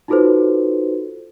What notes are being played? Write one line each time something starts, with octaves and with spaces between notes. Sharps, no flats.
D#4 F4 F#4 A4 B4 C5